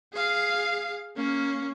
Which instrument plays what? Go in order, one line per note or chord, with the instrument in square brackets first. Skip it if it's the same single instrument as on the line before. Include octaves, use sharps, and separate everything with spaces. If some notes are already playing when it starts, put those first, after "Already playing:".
[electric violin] G#4 F5
A#3 C#4